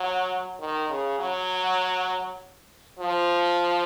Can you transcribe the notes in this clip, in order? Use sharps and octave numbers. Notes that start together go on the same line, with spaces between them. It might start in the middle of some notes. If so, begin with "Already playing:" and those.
Already playing: F#3
D#3
C#3
F#3
F3